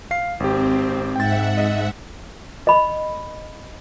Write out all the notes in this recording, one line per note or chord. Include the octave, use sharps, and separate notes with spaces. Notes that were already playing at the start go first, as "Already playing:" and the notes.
F5 C7
G#1 C4 G4
G#2 E5 F#5 G5 A6
D#5
D#5 B5